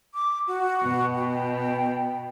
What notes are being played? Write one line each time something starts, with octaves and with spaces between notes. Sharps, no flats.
D6
F#4
B2
G5